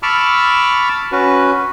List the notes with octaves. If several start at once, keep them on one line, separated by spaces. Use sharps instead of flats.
A5 B5 C#6 D6 E6 F6
C#4 F#4 B4